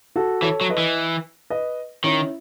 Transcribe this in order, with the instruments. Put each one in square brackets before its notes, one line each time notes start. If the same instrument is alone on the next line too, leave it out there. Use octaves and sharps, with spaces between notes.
[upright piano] F#4 A4
[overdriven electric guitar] E3 [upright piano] A4 C#5
[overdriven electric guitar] F#3
[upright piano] B4 D#5
[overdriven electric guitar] E3
[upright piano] B4 D#5
[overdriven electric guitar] D#3 [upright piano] C#4 E4